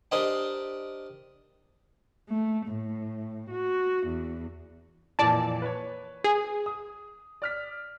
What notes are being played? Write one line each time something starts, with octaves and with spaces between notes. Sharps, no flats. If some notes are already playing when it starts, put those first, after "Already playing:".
D4 G4 A#4 C5 D#5 G5
A3
A2
F#4
E2
F2 A#2 E3 D5 A5
B4 C#5
G#4
D#6
D5 F6 B6